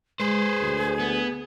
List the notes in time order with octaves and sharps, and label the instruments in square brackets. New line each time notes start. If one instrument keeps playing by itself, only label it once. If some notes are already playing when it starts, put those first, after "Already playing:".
[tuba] G#3 [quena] G#4 [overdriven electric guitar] B4 C5
[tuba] D2
[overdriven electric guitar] B3